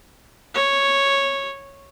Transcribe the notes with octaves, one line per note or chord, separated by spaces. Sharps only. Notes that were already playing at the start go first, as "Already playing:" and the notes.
C#5